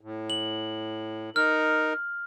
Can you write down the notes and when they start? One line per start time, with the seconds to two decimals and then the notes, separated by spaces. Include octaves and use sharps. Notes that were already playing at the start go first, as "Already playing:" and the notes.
0.01 A2
0.30 F#7
1.36 D#4 A#4 F6